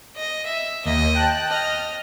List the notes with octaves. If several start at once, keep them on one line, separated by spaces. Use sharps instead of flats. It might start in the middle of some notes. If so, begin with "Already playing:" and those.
D#5
E5
D#2 D#5
G5 A5 F#6
D#5 F6